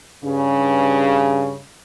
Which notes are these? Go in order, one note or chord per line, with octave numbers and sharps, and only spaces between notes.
G2 C#3